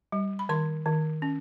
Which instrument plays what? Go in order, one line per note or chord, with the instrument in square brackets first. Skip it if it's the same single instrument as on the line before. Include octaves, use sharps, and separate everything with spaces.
[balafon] G3
B5
D#3 C6
D#3
C#4